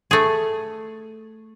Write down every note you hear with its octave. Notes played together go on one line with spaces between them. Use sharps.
A3 G#4